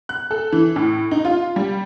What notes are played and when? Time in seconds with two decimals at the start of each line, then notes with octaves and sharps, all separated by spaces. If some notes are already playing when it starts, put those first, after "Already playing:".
0.09 F#6
0.31 A4
0.52 E3
0.76 A2
1.11 D#4
1.25 F4
1.56 G3